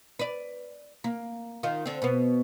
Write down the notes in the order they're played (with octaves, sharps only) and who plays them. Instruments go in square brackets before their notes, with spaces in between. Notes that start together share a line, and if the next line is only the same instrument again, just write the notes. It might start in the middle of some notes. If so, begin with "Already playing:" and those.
[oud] B4 D5
A#3
D#3 F4
D3 C4
B2 B3